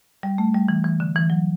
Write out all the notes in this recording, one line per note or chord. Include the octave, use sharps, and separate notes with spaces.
G3
A3
G3
E3
E3
D3
E3
F#3